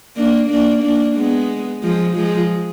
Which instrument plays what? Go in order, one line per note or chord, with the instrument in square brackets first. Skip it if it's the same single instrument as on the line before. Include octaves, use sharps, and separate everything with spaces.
[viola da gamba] A#3 D4
A#3 D4
A#3 D4
G#3 B3
F3 G#3
F3 G#3